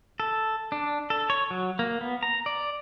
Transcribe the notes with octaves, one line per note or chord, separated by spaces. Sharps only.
A4
D4
A4
C#5
F#3
A#3
B3
A#5
D5